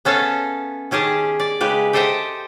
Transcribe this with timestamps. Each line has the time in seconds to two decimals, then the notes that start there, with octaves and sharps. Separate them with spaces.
0.05 B3 C#4 A4 E5 F5
0.91 D#3 C#4 G4 G#4 A5
1.40 D5
1.61 C#3 G#3 G4 B4
1.93 G4 A4 C5 D#5 E5 G5